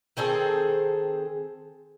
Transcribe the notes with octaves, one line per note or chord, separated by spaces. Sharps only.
D#3 C4 G#4 A4